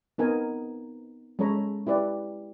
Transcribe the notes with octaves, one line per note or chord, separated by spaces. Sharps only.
B3 C4 D#4 A#4 B4 G#5
G#3 C#4 A4 C#5 A#5 B5
E4 G4 B4 D5